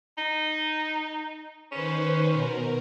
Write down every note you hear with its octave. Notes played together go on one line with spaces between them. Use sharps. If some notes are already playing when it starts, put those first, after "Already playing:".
D#4
D#3 C#4 B4 C5
B2 A#4